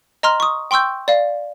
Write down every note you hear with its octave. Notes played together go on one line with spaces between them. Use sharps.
D#5 A#5 C6 F6
C#6 D#6
G5 C6 C#6 E6 G6
D5 F5